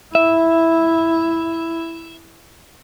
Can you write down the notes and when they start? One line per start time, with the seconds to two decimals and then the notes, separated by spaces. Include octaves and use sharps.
0.15 E4 E5